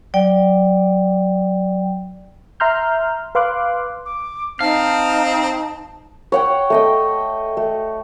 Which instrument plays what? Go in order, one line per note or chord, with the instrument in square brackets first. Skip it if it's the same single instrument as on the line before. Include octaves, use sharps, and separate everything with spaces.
[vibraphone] F#3 D5 G5
[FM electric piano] E5 A#5 C6 F6 G6
B4 F5 C6 D6 F#6
[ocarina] D6
[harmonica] C4 [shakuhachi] D#4 [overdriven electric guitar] F5 [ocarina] A5
[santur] C#5 F#5 G5
A3 D#5 G5
A3